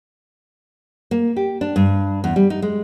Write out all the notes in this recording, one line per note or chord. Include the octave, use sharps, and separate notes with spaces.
A#3
G4
D4
G2
E2
G3
D#4
G#3